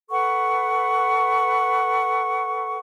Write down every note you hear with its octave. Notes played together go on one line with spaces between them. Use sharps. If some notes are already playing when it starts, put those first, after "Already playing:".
A4 B4 F#5 C#6